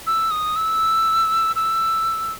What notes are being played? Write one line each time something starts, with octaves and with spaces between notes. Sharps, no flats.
E6
D#6
E6
E6